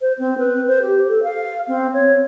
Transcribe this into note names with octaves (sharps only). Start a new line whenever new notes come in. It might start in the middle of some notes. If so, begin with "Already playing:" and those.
C5
C4
B4
C5
G4
A4
F5
C4
C#5